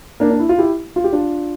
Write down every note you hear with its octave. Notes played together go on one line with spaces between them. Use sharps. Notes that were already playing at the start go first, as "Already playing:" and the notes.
A#3 D4
D4
E4
F4
E4 G4
F4
G4
D4 F4